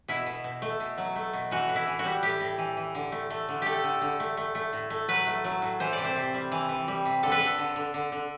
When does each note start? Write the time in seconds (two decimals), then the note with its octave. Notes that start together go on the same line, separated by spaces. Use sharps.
0.08 B2 E4
0.26 B2
0.44 B2
0.62 A3
0.80 B2
0.98 F#3
1.16 A3
1.33 B2
1.51 E3 F#4
1.69 A2
1.76 E4
1.87 E3
1.99 F#4
2.05 G3
2.23 A2 G4
2.40 A2
2.58 E3
2.77 E3
2.95 D3
3.12 A3
3.30 A3
3.49 D3
3.62 A3 G4 A4
3.84 D3
4.01 D3
4.20 A3
4.37 A3
4.55 A3
4.73 A2
4.90 A3
5.09 F#3 B4
5.27 A3
5.44 F#3
5.62 A2
5.80 E3 C5
5.93 C3 D5
6.05 C5
6.16 C3
6.34 G3
6.52 E3
6.69 E3
6.88 G3
7.05 C3
7.23 D3 A4
7.32 B4
7.39 D3 A4
7.58 D3
7.76 D3
7.94 D3
8.12 D3